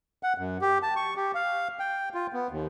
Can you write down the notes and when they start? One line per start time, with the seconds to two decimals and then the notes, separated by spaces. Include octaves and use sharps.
0.23 F#5
0.38 F#2
0.61 G4
0.83 A5
0.96 C#6
1.16 G4
1.35 F5
1.79 G5
2.14 F4
2.33 B3
2.51 D#2